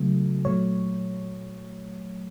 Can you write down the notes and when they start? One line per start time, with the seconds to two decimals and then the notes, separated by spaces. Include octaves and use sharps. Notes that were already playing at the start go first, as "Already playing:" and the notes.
Already playing: C#3 F#3 A3
0.45 A#2 F#3 A3 C#5